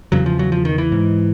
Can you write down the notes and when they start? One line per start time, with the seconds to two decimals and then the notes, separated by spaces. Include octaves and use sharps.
0.12 E2 C#3 F#3
0.26 F3
0.39 F#3
0.52 F3
0.65 D#3
0.78 E3
0.92 G#2